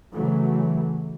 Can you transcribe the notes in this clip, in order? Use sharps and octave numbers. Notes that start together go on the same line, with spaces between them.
C#3 E3 F#3 A3